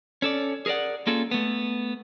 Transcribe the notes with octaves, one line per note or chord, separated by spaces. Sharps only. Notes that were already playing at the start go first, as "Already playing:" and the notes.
C#4 A4 D5
G#4 A#4 C5 D5 F#5
A#3 C#4 F4 G#4 A4
A3 B3